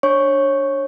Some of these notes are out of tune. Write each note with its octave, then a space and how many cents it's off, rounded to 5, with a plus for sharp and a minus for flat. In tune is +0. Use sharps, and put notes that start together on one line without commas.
D4 +0 C#5 -25 C#6 +0